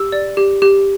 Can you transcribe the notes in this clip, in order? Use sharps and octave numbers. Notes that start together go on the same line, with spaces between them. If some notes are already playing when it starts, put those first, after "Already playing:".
Already playing: G4 E6
D5
G4
G4